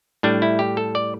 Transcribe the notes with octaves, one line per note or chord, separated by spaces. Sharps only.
A2 G3 D4
E4
G4
A4
D5